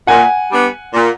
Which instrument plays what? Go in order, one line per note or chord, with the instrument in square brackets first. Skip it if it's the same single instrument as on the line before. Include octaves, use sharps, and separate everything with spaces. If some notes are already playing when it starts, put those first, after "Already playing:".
[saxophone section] A#2 [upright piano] F#5 G#5
[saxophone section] G3 B3 D4
A#2